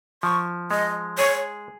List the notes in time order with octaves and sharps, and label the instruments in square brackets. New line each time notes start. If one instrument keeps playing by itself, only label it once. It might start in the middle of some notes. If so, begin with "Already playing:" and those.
[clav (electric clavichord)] F3 [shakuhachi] C#6
[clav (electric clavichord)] G#3 [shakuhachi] D#5
[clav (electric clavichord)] G#4 [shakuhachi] C#5